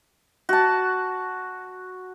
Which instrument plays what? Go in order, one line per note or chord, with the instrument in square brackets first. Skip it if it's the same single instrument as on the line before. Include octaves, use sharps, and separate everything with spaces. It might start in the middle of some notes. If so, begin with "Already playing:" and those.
[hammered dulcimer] F#4 A5